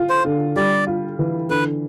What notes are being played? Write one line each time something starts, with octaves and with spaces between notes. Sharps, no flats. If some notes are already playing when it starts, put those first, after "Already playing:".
Already playing: F4
C5
D3
G3 D5
F4
E3
D3 B4